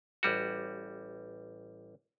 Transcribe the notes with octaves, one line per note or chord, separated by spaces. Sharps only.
A1 G3 F#4